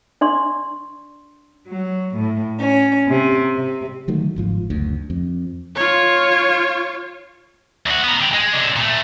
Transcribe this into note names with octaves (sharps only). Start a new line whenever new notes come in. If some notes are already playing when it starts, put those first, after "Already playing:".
D4 D5 C6 C#6
F#3
A2
C#4
C3
C3
D3 D#3 F#3 A3
G1 G#2 F3
F#1 D2
F2
F4 C#5
D2 F#4
B3 A#4
D3 G4
G#3
C3 D4
A#2 A3